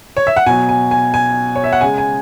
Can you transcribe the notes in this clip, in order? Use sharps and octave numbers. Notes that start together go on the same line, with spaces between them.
C#5
E5
F#5
B2 F#3 G#5
G#5
G#5
G#5
C#5
E5
F#5
C#3 G#3 G#5
G#5